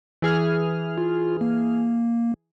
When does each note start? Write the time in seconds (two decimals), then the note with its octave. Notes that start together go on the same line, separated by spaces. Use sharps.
0.22 E3 G#4 F6
0.98 F4
1.41 A#3